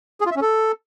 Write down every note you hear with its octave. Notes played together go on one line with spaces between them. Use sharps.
G#4
F4
E5
C#4
A4